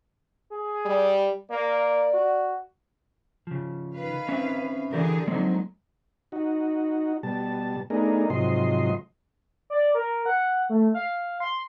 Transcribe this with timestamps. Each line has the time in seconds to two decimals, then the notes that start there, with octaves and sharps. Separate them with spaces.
0.52 G#4
0.85 G3
1.51 A#3 D5
2.14 F#4
3.47 C#3 F3
3.95 D#3 B4 F5
4.29 C4 C#4 E5
4.93 D3 E3 D4 G4 G#4 A#4
5.28 D3 F3 F#3 G#3 A#3 C4 D#4
6.32 D#4 F#4
7.23 B2 G3 A5
7.90 A3 B3 D4 D#4 G#4 A#4
8.30 G#2 C3 F3 F#3 D#5 C6
9.70 D5
9.95 A#4
10.26 F#5
10.69 A3
10.94 F5
11.40 C6